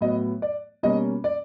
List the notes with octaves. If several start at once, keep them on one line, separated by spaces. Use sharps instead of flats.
A2 F#3 B3 D#5
D5
B2 G3 A#3 C#4 D#5
D5